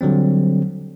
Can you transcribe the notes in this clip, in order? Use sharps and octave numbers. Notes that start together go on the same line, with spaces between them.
D3 F#3 G3 C4